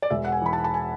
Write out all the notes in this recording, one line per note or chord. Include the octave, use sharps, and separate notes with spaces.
D5
E1 E5
F#5
G#5
E3 B5
A5
A5
G#5